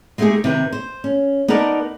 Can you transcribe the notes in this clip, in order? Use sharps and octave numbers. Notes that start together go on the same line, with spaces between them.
G#3 A3 B3 D#4 G4 G#4
C3 D#3 B4
C5
C#4
B3 D#4 A4 A#4 D5